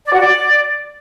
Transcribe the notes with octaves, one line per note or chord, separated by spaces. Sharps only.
D5
F#4
D5